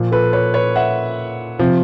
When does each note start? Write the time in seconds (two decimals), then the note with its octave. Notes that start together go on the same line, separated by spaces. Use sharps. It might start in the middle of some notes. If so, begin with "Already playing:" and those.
Already playing: A#2 F3
0.12 A4 B4
0.33 B4 C#5
0.54 B4 C#5
0.76 E5 F#5
1.59 C3 F3